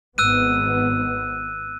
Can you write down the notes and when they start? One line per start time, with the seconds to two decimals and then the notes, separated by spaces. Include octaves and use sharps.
0.18 G#1 G#2 B3 E6 F#6 D#7